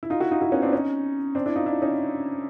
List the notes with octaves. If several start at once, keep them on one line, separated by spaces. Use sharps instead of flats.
E4
D#4 F4
E4 F#4
D#4 F4
E4 F#4
B3 C#4
C4 D4
C#4 D#4
C4 D4
D4 E4
D#4 F4
D4 E4
C#4 D#4